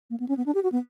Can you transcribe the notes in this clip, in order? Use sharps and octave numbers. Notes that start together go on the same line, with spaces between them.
A#3
B3
C#4
B3
D4
G4
F#4
B3